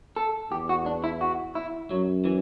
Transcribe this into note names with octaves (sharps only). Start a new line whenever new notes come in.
A4
E2 G4
F#4
D4
E4
F#4
E4
F#2 F#3
E3